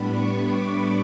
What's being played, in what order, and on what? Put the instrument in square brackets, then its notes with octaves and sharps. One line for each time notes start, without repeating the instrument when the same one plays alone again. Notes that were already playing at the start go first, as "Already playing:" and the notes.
Already playing: [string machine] A2 G3 B3 D4 B5
C#6
D6